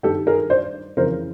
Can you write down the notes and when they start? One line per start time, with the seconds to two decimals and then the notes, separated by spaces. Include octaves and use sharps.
0.03 G2 D#3 G4 A4
0.27 G#4 A#4
0.50 C5 D5
0.97 F2 C#3 E3 A#4 C5